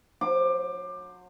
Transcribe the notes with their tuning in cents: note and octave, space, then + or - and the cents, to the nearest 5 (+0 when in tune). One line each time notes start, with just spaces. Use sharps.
F#3 -35 C5 +0 D6 +20